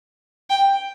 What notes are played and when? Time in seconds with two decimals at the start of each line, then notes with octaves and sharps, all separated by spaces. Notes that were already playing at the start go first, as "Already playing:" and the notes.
0.50 G5